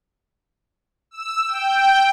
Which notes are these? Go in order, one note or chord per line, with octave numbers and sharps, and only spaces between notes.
E6
G5